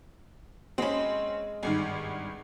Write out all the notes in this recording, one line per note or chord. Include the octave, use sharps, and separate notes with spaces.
G#3 C4 C#4 B5
G#1 G2 D#3 G#5